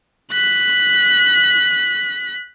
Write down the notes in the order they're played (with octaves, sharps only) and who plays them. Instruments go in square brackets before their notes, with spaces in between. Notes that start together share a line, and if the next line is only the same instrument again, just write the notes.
[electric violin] F#6 B6